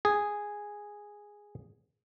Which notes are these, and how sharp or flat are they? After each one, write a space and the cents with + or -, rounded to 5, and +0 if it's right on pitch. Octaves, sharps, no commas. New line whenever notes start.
G#4 -5